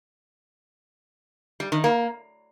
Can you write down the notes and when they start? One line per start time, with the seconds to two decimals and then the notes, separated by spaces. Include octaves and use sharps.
1.60 G3
1.72 D#3
1.84 A#3